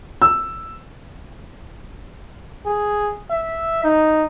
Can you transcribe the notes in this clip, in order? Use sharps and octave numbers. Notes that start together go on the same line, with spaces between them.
E6
G#4
E5
D#4